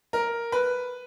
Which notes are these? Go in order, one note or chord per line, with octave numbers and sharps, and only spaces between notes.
A#4
B4